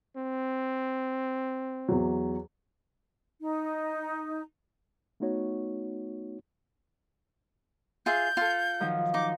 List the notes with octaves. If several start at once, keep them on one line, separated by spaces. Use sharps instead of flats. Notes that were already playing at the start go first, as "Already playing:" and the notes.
C4
E2 F#3
D#4
A3 B3 D#4 F#4 C#5
F4 G#4 E5 G6
F4 A4
D#3 F3 F#3
D#4 D6